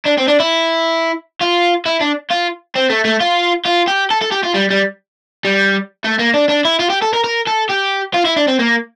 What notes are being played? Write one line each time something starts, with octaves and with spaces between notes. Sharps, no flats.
D4
C4
D4
E4
F4
E4
D4
F4
C4
A3
A3
F4
F4
G4
A4
A4
G4
F4
G3
G3
G3
A3
A#3
D4
D4
E4
F4
G4
A4
A#4
A#4
A4
G4
F4
E4
D4
C4
A#3